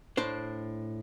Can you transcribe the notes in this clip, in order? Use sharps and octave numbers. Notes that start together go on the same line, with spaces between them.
A2 D4 C5